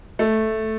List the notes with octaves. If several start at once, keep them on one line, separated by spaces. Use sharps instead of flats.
A3